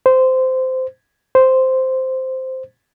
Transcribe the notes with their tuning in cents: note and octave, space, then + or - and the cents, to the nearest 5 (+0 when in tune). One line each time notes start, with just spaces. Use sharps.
C5 -15
C5 -5